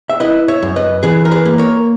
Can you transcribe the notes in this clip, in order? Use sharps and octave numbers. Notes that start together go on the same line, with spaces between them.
E5
E4 B4 D#5
C#5 E5
F#2
B4 D#5
E3 G#4 B4
A#4
G#4 B4
A#3
A#4 C#5